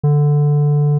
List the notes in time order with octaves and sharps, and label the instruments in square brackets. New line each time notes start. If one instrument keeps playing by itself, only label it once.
[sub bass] D3